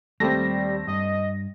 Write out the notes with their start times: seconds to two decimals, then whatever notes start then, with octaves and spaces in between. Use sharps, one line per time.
0.20 D#2 G3 A3 C4 A#6
0.87 G2 D#5